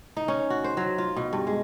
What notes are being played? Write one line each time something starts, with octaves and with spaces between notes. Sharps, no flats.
D#4
C#4
F#4
C5
F#3
F4
B2
G2
G#3